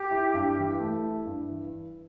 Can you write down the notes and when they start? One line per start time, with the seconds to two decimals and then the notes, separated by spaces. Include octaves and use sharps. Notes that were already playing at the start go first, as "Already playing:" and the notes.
Already playing: G4
0.11 E4
0.34 G2
0.57 E3
0.80 A3
1.03 E4
1.26 G2
1.49 E3